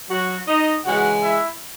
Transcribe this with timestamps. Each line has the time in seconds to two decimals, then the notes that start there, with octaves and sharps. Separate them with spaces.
0.10 F#3 F#4
0.48 D#4 D#5
0.85 C#3 E3 G#3 F#4 F#5
1.22 E4 E5